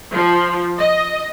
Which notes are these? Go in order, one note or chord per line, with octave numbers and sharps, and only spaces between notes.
F3
D#5